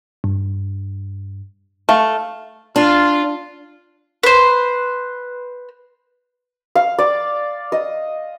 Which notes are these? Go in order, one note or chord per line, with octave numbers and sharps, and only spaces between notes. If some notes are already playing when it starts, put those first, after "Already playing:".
G2
A3 F5
D4 F4
B4 C5
F5
D5
D#5